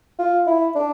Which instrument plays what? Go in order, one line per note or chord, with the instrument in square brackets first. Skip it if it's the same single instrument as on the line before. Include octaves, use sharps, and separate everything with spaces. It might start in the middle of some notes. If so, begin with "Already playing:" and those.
[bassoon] F4
E4
D4